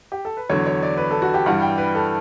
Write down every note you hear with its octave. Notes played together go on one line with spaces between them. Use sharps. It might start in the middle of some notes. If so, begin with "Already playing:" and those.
G4
A4
B4
E2 D3 F#3 C#5
C#5
D5
B4
A4
F#4
G4
G2 E3 G3 F#5
G5
B4
A4